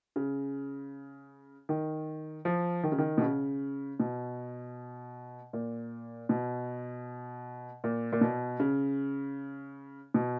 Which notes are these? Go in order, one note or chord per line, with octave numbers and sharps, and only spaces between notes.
C#3
D#3
F3
D#3
C#3
D#3
B2
C#3
B2
A#2
B2
A#2
A#2
B2
C#3
B2